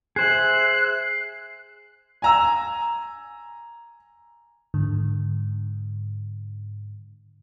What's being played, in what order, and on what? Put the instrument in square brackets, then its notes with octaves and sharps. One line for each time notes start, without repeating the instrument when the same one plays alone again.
[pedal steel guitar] G#4 C5 E5 [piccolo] F#6 [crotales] C7
[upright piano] G#5 A#5 E6
[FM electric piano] G#2 D3